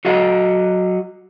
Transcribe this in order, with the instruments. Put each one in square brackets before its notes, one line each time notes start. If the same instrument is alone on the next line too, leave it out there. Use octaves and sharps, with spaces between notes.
[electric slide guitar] F#3 F#4 D#5 F5